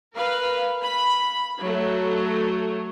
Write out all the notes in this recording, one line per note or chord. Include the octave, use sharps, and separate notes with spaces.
A#4 B4 F5
B5
F#3 A3